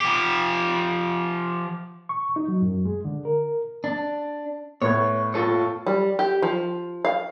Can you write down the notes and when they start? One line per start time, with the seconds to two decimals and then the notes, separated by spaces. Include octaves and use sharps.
0.01 F3 G4
2.09 C#6
2.36 D#4
2.48 F#3
2.62 F#2
2.85 G#3
3.05 D3
3.25 A#4
3.84 D4
4.82 A2 B3 C#5 G#6
5.34 F4 A4 C#5
5.86 G3
6.19 G4
6.42 F3
7.05 F5